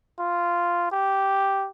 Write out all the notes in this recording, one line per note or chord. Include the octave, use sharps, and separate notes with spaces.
F4
G4